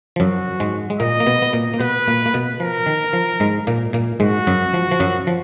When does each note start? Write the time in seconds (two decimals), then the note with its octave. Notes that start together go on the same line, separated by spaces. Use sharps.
0.16 F3
0.20 F#2 F#3 F#4
0.60 G#2 G#3
0.90 G#3
1.00 A#2 A#3 D#5
1.20 A#3
1.26 B2 B3
1.42 B3
1.53 A#2 A#3
1.74 A#3
1.80 B2 B3 B4
2.07 A#2 A#3
2.26 A#3
2.34 B2 B3
2.60 F3 A#4
2.86 D#3
3.13 F3
3.40 G#2 G#3
3.67 A#2 A#3
3.93 A#2 A#3
4.20 G#2 G#3 F#4
4.47 F#2 F#3
4.74 F3
4.91 F3
5.00 F#2 F#3
5.27 F3